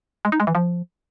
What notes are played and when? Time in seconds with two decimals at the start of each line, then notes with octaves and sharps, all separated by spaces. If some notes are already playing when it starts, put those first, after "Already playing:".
0.25 G#3
0.32 D#4
0.40 G#3
0.47 E3
0.55 F3